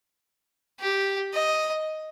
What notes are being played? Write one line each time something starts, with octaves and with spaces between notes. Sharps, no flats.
G4
D#5